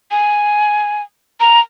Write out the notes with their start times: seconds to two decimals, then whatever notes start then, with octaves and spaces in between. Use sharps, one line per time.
0.11 G#5
1.40 A#5